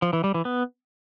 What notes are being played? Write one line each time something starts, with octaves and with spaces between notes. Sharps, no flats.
F3
E3
G3
E3
B3